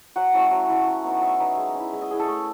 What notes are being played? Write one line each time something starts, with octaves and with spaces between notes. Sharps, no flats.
F#3 F#5
A3 C#4 E4
F#3
A3 C#4 E4
F#3
B3 D#4
F#3 E5
B3 D#4
G#3
C#4 E4
G#3 E5
D#5
C#4 E4 G#4
A4
A3